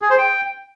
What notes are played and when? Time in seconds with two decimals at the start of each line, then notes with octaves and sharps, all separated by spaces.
0.02 G#4
0.10 C5
0.18 G5